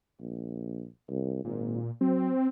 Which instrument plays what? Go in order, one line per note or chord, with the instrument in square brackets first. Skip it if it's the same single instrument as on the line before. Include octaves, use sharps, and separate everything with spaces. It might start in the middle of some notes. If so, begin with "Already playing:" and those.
[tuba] A#1
C2
[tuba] G#1 [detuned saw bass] A#2
[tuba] F#3 [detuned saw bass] C4